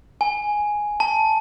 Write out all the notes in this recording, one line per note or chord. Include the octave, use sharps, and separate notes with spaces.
G#5
A5